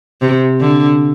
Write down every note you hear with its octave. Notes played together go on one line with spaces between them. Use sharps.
C3
D3